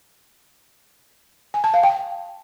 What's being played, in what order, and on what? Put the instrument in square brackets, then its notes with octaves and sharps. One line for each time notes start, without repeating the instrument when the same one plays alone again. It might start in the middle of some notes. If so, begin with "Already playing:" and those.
[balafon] G#5
A5
F5
G5